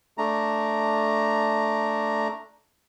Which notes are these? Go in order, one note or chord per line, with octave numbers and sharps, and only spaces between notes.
A3 D4 A#5